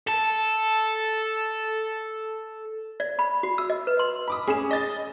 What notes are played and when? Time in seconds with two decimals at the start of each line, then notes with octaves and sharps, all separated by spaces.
0.07 A4 A5
3.00 D5
3.19 B5
3.43 F#4
3.58 E6
3.70 D#5
3.87 B4
3.99 C6
4.28 B5 D6 D#6
4.47 C#4 G#4 E7
4.71 D#5 A6